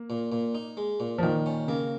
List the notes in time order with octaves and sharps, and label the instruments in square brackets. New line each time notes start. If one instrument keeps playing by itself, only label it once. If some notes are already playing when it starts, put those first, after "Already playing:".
Already playing: [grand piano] A#3
[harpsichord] A#2
A#2
D#4
G#3
A#2
[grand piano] F3
[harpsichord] A#2 [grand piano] D#3
[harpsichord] C#4
[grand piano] C#3 [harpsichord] A#3